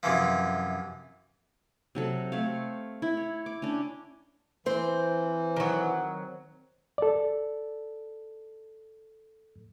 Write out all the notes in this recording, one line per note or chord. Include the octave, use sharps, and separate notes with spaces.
F#2 C3 E3 F3
C3 F#3 A4
A3 C4 C#5 F5
E4
C#5
D6
C#4 D4 G5
E3 C4 C5
D#3 F#3
A4 D5